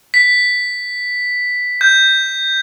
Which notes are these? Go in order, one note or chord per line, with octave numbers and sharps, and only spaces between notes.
B6
G6